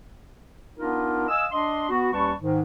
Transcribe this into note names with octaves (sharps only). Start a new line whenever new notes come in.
B3 D4 D#4 F4 A#4
D#5 F5 G#5 D#6 E6
D4 D#5 C6
B3 F#4
D#2 G3 C#4 B4 A5 C#6
G#2 D#3